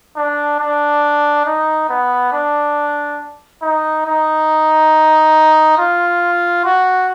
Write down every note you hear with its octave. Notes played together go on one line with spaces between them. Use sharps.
D4
D4
D#4
B3
D4
D#4
D#4
F4
F#4